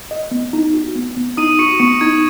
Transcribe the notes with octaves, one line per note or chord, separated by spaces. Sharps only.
D#5
B3
D#4
F#4
B3
B3
D#4 D#6 D#7
F#4 C#6 C#7
B3 C#6 C#7
D#4 G#6